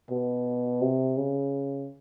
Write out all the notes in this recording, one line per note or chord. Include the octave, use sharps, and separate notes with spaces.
B2
C3
C#3